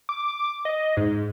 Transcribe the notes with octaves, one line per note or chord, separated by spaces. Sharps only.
D6
D#5
G#2